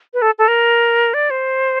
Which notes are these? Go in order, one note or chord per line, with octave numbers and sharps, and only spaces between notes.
B4
A4
A4
A#4
D5
C5